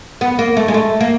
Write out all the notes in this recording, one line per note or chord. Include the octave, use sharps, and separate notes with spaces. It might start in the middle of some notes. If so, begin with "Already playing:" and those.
B3
A#3
A3
G#3
A3
A#3